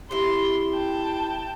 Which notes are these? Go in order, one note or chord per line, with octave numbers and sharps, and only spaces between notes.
C3 E4 C6
G5 A5